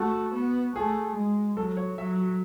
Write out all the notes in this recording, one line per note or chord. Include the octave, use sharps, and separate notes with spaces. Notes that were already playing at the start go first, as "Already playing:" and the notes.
Already playing: A3 F#4
B3
A3 G#4
G#3
F#3 A4
C#5
F#3 E5